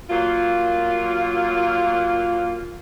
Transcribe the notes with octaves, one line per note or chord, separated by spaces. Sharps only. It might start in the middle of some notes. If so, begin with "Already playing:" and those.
F#3 A#3 F4